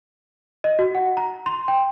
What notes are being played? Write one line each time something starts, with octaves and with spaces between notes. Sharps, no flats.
D#5
F#4
F#5
A#5
C6
G5